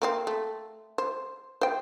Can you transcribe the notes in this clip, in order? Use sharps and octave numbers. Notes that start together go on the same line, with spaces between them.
A#3 C4 F5
A3
C5
C5 G5